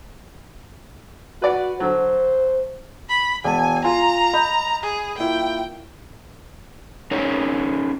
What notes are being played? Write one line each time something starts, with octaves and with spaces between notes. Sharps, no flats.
F#4 B4 D5 F#5
D3 F#3 C5
B5
E1 G#5 A5
F4 G#5 A#5 C6
D#5 B5 G6
G#4
A#3 E4 F4 G5
C#4 D#4 G#4 A#4 C#5